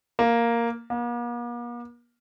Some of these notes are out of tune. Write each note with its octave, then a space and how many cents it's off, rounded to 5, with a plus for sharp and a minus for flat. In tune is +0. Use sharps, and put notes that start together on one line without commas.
A#3 +0
A#3 +45